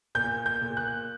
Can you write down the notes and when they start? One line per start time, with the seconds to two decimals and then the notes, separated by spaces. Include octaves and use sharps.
0.15 A#2 G6
0.46 G6
0.62 A#2
0.77 F#6